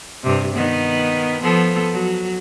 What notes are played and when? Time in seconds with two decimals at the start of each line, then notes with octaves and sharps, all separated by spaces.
0.23 G2 C3
0.55 D#3 B3
1.42 F3 B3 A4
1.92 F#3